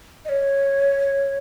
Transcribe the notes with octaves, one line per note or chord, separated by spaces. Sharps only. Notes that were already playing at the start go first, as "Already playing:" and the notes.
D#5
C#5